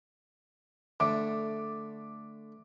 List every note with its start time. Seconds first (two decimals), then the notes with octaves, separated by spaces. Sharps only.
1.00 D3 A3 D6